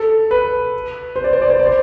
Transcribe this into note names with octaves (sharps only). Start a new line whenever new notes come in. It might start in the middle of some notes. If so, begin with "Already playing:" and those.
Already playing: A4
B4
C5
D5
C5
D5
C5
D5
C5